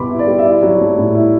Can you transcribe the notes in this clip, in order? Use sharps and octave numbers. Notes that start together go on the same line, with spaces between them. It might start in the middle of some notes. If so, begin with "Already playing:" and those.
Already playing: B2 G3 B3 E4 B5 C6 D6
E4
D5
G3
E5
E4 D5
F#3
A3
A2
E4